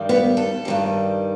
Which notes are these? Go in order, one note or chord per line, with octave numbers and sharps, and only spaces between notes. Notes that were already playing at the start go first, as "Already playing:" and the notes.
Already playing: G2 D#3 G3
B3
A4
G2 D#3 G3